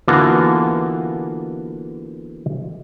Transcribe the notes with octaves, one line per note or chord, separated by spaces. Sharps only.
D3 E3 A#3 B3 F4 F#4